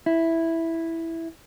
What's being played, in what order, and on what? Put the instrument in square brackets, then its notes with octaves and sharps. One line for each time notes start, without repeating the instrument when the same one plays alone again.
[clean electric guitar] E4